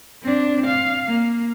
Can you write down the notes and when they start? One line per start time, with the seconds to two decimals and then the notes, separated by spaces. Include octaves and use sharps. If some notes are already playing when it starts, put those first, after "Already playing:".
0.22 C4 D4
0.67 F5
1.07 A#3